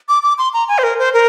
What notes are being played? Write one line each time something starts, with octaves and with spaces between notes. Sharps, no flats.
D6
D6
C6
A#5
G#5
C5
A#4
C5
A#4